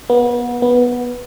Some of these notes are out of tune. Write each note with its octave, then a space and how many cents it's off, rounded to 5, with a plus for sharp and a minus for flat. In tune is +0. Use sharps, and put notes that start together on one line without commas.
B3 -30
B3 -10